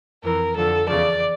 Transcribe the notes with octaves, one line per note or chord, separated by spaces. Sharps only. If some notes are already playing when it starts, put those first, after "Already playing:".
F2 E3 A#4
F2 D3 F3 A4
E2 C#3 F3 D5